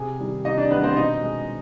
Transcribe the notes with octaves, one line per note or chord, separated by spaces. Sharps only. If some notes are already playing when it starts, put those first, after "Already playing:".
Already playing: C3 G#4 G#5
D#3 G3
C3 D#4 D#5
D4 D5
D#3 B3 B4
G3
C4 C5
B2 D#4 D#5
G#3